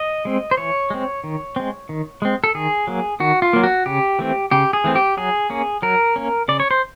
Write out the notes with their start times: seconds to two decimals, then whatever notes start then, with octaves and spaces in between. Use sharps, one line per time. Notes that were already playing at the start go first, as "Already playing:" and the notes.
Already playing: D#5
0.25 G#3 C4
0.51 C5
0.57 E3 C#5
0.90 G#3 C4
1.24 D#3
1.56 G#3 C4
1.89 D#3
2.22 G#3 C4
2.44 A4
2.55 D#3 G#4
2.87 F#3 A#3
3.20 D#3 F#4
3.42 F4
3.53 F#3 A#3
3.64 F#4
3.86 C#3 G4
4.19 E3 A3 C4
4.51 C#3 G4
4.73 G#4
4.84 E3 A3 C4
4.95 G4
5.17 F#3 G#4
5.50 A#3 C#4
5.82 F#3 A#4
6.16 A#3 C#4
6.48 C#3 D5
6.60 C#5
6.71 C5